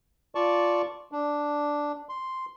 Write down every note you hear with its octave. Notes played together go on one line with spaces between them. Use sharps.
F4 D5 A5 C#6
D4
C6